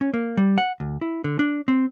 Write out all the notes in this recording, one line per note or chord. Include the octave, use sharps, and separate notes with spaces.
C#4
A#3
G3
F#5
D2
E4
D3
D4
C4